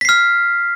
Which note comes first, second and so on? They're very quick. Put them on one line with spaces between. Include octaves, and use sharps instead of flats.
B6 C7 F6